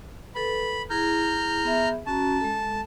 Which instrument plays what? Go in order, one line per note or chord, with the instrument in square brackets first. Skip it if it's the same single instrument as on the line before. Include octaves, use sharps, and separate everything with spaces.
[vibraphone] A4 B4 [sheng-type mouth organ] B5
[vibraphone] E4 G#4 [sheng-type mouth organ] A#5 F6 G6
[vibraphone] B3 G#4 E5
[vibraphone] C#4 F#4 A#5 [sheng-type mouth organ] A5
[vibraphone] G#3 A4